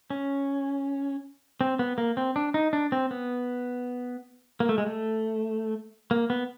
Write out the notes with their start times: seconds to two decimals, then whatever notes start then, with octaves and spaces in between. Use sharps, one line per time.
0.10 C#4
1.61 C4
1.79 B3
1.98 A#3
2.17 C4
2.36 D4
2.54 D#4
2.73 D4
2.92 C4
3.11 B3
4.60 A#3
4.69 A3
4.78 G#3
4.87 A3
6.11 A#3
6.30 B3